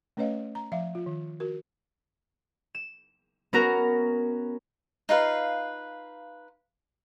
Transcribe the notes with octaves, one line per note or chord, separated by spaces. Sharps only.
A3 C#4 B4 C#5 D#5 F5
A#5
F3 E5 F5
F4
D#3
F#4 A#4
E7
B3 C#4 F#4 A#4 A#5
D#4 F4 B4 F5